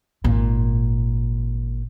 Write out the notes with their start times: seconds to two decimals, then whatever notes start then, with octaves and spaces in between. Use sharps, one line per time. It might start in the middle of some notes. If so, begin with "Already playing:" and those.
0.24 G#1 A#2